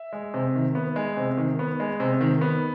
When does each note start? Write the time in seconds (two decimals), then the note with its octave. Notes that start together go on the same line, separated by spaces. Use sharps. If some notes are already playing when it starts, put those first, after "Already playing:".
Already playing: E5
0.13 G#3
0.34 C3
0.55 D#3
0.75 B3
0.96 G#3
1.17 C3
1.37 D#3
1.59 B3
1.80 G#3
2.00 C3
2.21 D#3
2.41 B3